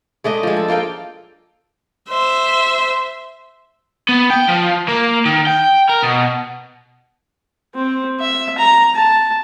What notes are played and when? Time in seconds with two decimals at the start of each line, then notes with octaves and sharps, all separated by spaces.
0.24 G#3 A3 D4 D#5
0.43 F3 G#3
0.57 A4
0.68 A#3 F4 A4 G5
2.09 C5 E5
4.09 B3
4.30 G5
4.48 F3
4.88 A#3
5.25 D#3
5.47 G5
5.90 A#4
6.03 B2
7.75 C4
8.20 E5
8.58 A#5
8.95 A5